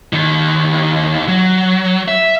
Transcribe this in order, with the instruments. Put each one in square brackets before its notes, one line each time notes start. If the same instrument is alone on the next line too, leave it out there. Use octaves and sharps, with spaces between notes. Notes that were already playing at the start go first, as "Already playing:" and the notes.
[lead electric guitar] D#2 D#3
F#3
E5